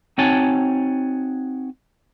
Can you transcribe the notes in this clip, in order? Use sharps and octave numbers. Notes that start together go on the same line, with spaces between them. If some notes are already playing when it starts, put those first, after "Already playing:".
C4 D#4 F#4 C#5 G#5 A5